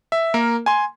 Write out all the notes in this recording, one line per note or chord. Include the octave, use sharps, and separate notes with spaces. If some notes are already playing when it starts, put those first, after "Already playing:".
E5
A#3 A#4
G#5 C6